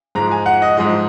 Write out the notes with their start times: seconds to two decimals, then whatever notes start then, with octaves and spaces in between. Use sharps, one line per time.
0.15 G#2 F3 G#3 A#5
0.31 G#5
0.46 F#5
0.62 D#5
0.77 G#2 F3 G#3 D#5